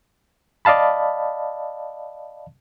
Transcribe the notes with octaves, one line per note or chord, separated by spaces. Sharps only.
D5 D#5 F5 A5 B5